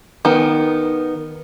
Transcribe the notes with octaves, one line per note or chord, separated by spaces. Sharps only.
D#3 B3